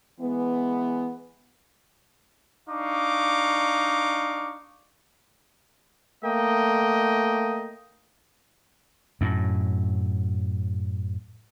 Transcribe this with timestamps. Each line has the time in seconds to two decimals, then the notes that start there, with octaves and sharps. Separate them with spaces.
0.21 E3 G#3 B3
2.69 D4 D#4 F5 C#6 D6
6.24 A3 A#3 D#5 G5
9.21 F#2 A2